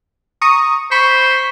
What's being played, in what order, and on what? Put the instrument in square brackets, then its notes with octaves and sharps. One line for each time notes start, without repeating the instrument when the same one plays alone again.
[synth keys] A#5 C#6 D#6
[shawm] C5 [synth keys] B5 C#6 B6